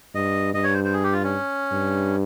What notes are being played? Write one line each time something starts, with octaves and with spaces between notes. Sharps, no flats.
G2 D#5
G2 D#5
C#5
C5
C5
G#4
G4
F4
C#4
G2